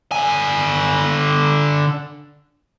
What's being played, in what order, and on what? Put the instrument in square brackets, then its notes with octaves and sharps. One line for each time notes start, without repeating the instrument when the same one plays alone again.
[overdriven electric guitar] D3 G#5